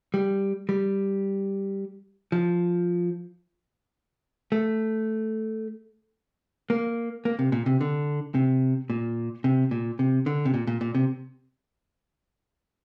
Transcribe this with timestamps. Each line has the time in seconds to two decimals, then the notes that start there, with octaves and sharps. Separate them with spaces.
0.14 G3
0.69 G3
2.32 F3
4.52 A3
6.70 A#3
7.25 A#3
7.39 C3
7.52 A#2
7.66 C3
7.81 D3
8.35 C3
8.90 A#2
9.44 C3
9.71 A#2
9.99 C3
10.26 D3
10.45 C3
10.54 A#2
10.67 A#2
10.81 A#2
10.95 C3